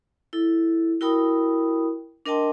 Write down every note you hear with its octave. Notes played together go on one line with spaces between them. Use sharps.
E4 A4
E4 F#4 A#4 G5 B5 D#6
D4 A#4 D#5 G5 A5 C6